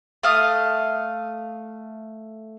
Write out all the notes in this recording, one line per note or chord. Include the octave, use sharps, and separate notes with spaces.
A3 F5 D#6